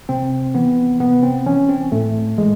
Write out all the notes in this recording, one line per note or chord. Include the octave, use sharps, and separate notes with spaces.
C3 C4
E3 B3
C3 B3
C4
E3 C#4
C4
A2 A3
E3 G#3